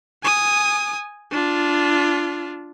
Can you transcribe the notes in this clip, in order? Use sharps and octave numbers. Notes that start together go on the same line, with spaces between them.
G#5 D#6
D4 F4